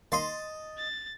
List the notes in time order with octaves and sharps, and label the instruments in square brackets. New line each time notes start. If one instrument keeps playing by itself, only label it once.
[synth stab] D#3 A#3 C6 [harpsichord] D#5 A5
[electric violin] A6